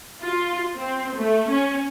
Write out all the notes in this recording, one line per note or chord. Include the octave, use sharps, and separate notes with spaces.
F4
C4
A3
C#4